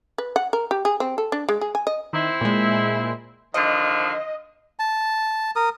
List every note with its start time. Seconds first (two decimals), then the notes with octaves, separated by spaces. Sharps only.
0.18 B4
0.36 F#5
0.53 A#4
0.71 G4
0.85 G#4
1.00 C4
1.18 A4
1.32 D4
1.49 G#3
1.61 G#4
1.75 G#5
1.87 D#5
2.13 D#3 C4 E4
2.41 A#2 G#3
3.54 D3 D#3 F3 D#5
4.79 A5
5.56 A#4 D#6